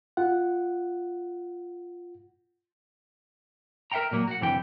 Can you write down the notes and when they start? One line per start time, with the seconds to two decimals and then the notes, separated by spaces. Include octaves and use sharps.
0.17 F4 F#5
3.92 A#4 E5 F#5 G5 A#5
4.11 A#2 F#3 A#3
4.28 F#4 F#5
4.41 C2 F2 D3 E3 G4 G5